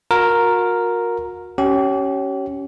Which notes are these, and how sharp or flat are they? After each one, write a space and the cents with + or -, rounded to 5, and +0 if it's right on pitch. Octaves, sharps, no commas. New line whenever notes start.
F#4 -40 A#4 +0
C#4 +0 G4 -40